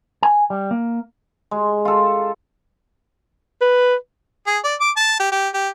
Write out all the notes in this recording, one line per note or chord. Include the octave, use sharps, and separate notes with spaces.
G#5
G3
A#3
G#3
F4 A4
B4
G#4
D5
D6
A5
G4
G4
G4